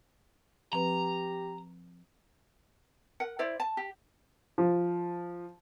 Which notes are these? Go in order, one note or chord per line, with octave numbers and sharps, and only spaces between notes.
F3 C4 G4 B4 A#5
A#4 F#5
E4 C5 D5 E5
A5
G4
F3